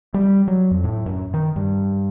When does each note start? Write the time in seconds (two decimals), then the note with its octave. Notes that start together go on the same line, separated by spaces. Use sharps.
0.14 G3
0.48 F#3
0.71 F2
0.84 A2
1.06 F#2
1.34 D#3
1.56 G2